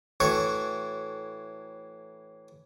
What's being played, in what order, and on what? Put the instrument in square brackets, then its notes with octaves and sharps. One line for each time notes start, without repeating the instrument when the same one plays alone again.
[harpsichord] A2 E3 F#4 C#5 C#6